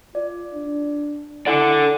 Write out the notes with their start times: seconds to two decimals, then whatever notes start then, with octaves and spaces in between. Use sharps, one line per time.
0.15 F4 D5
0.54 D4
1.46 E4 A4 D5 F#5 G#5 D6